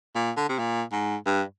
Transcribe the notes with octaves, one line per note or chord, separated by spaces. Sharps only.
A#2
D3
C3
A#2
G#2
G2